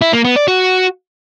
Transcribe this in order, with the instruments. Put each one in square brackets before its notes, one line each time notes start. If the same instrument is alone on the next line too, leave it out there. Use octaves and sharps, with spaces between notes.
[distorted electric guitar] E4
A#3
B3
D5
F#4